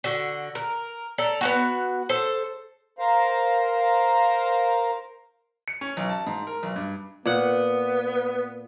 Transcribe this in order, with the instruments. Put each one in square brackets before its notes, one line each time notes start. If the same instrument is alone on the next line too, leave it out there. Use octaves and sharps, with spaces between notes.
[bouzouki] D3 F#4
A#4
A4 D5 A#5
B3 D#4 F#4
A4 C5
[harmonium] A#4 C5 F5 A#5
[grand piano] C#7
C#4
B1
A5
G#2
A#4
B1
G2
[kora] A#2 F#5 [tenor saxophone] B3